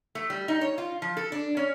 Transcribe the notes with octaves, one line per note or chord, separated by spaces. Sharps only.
A3
G3
D#4
C#5
F4
F3
A4
D4
C#4